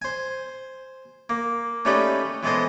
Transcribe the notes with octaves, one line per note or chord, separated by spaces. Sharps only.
C5 G#5
A#3
A3 C#4 D#4 G4 B4 D5
E3 G#3 B3 A4 C5 D#5